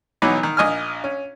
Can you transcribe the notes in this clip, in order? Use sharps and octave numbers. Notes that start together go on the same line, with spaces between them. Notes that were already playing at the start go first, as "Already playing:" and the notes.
B1 E3 F#3 B3 D#4 D6
D#3
A#1 D#5 G#5 F6
C#4